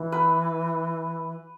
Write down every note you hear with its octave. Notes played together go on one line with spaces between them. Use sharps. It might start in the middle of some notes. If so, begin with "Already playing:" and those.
Already playing: E3
B4